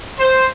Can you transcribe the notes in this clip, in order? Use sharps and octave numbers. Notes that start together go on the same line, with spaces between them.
C5